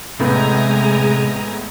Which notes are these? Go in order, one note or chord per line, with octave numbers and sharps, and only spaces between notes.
E2 A2 C3 G#3 B3 G#5 A#5